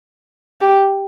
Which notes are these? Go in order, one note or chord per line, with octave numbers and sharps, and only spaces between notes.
G4